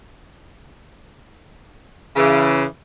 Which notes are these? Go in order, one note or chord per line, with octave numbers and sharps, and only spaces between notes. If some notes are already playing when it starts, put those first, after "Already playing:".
C#3 E3